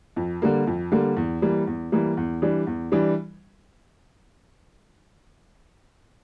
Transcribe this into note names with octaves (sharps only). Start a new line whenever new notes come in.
F2
D3 G3 A#3
F2
D3 G3 A#3
E2
E3 G3 A#3
E2
E3 G3 A#3
E2
E3 G3 D4
E2
E3 G3 D4